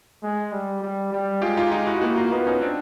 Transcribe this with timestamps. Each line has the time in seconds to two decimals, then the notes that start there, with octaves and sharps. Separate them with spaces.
0.23 G#3
0.52 G3
0.82 G3
1.12 G3
1.42 G#3 F4 G4
1.57 D#4 F4
1.72 D#4 F4
1.87 E4 F#4
2.01 A#3 E4 F#4
2.16 D#4 F4
2.31 B3 D#4 F4
2.46 C#4 D#4
2.61 C4 D4